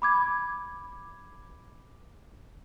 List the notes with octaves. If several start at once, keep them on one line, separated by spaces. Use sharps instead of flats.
B5 D6 G#6